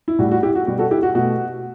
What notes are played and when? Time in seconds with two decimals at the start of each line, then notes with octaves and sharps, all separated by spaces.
0.08 E4
0.19 A2 G3 F#4
0.31 F#4
0.43 E4 G4
0.55 F#4
0.67 B2 G3 F#4
0.79 F#4 A4
0.91 E4 G4
1.03 F#4
1.15 B2 A3 F#4